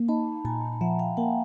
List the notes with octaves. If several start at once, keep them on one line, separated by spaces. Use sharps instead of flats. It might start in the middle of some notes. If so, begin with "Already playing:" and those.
Already playing: A#3
D#4 A5 B5
A#2 G#5 A#5
F3 E5 F#5
F5 G5
A#3 F#5 G#5